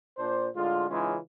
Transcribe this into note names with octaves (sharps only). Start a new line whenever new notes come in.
A#2 D4 C5
A2 D3 G#3 F4
C#3 E3 G#3 C#4 D#4 F4